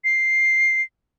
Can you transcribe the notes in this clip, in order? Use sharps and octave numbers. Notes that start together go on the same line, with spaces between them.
C7